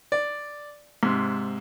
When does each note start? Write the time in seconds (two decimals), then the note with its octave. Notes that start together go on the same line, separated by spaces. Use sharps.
0.12 D5
1.03 G#2 C3